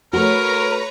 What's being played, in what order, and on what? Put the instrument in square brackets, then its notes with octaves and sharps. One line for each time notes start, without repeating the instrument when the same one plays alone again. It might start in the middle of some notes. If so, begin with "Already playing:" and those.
[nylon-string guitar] A3 F#4 [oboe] A#4 [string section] B4 C#5 A#5